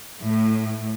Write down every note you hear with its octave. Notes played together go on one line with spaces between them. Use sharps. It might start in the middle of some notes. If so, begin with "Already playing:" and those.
A2